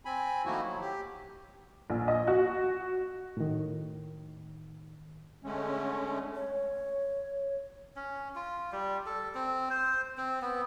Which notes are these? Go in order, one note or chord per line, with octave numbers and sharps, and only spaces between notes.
C4 G#5 B5
D#3 F3 A3 A#3 E4 F#4
F#3
G4
A#1
D#5
F#4
A2 D#3
D3 G#3 A3 C#4
C#5
C#4
F4
G3
A4
C4
C5
C4
B3